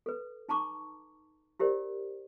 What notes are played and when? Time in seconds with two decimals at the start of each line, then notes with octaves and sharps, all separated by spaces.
0.06 A4 B4
0.49 D#4 A5 A#5 C#6 D6
1.60 E4 G4 A#4 C5 D5